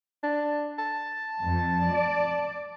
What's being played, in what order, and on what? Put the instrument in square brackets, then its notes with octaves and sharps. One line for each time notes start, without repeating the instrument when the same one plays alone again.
[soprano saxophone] D4
A5
[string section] F2
D5